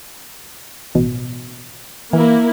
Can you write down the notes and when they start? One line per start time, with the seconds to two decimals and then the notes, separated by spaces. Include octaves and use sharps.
0.95 A1 B2
2.13 E3 A#3 E4